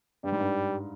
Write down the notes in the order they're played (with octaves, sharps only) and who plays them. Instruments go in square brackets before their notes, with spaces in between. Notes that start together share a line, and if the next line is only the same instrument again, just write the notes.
[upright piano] G2 [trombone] G3
[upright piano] G#2
G2